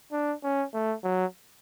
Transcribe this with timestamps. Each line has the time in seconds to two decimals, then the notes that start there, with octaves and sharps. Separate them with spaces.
0.12 D4
0.43 C#4
0.74 A3
1.04 F#3